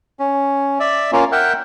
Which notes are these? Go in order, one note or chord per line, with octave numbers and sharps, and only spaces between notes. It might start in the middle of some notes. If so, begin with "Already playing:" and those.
C#4
D5 E5
A#3 C#4 F4
A#4 E5 F#5 G5